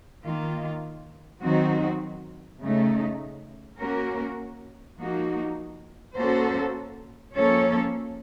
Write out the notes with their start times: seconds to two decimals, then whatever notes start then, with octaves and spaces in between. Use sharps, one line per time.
0.24 D#3 A#3 F4
1.43 D#3 F#3 C4 D#4 F#4
2.61 C#3 A3 D#4
3.79 A#3 C#4 F#4 A#4
4.98 F3 A#3 D#4 F#4
6.16 A#3 C#4 F#4 A4 C5
7.34 F3 A#3 C#4 A4 C#5